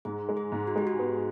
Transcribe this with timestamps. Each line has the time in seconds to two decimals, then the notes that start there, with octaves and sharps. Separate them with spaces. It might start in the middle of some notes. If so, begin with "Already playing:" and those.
0.05 G#2 G#4
0.29 G#3
0.37 G#4
0.52 G#2
0.67 F#4
0.76 G#3 G4
0.87 F#4
0.99 B3